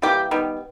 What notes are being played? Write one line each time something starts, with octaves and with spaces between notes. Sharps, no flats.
E3 G3 A#3 G4
D#3 G3 B3